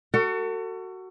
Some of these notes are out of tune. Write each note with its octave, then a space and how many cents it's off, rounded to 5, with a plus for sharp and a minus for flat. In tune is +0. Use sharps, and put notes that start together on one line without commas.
F#4 +15 A4 +40